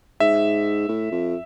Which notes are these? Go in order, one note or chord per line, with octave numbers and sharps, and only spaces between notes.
G#2 E5
A2
F2